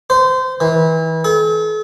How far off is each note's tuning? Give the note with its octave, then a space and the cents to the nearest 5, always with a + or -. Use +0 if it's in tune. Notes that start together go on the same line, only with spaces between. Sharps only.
C5 -25
E3 -30
A4 -45